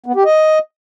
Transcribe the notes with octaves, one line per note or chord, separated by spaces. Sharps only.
B3
G4
D#5